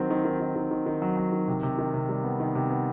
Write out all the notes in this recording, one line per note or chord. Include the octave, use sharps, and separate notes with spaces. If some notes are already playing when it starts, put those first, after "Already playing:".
Already playing: D#3 F#3 C4
D#3
D#3
D#3
D#3
D#3
D#3
F#3
F#3
D#3
C3
C3
D#3
C3
G3
B3
D#3
C3
B3